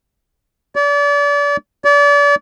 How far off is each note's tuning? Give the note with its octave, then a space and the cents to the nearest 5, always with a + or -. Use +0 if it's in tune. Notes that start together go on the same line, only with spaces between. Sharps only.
D5 -35
D5 -35